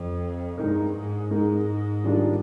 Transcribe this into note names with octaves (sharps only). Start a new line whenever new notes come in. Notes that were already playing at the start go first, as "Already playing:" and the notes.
Already playing: F2
G2 G#3 D#4 A#4
G#2
G#2 G#3 D#4 A#4
D#3 G3 D4 F4 A#4